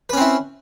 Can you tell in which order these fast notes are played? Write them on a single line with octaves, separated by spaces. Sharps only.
B4 C#4 C4 E4